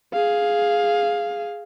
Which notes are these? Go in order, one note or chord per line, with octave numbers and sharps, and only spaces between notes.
G#4 F5